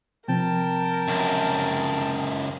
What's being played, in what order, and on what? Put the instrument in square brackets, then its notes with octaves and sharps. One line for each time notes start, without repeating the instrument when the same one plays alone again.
[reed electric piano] C3 F3 C4 [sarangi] A#4 [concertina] G5 A5
[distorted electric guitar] C#2 F#2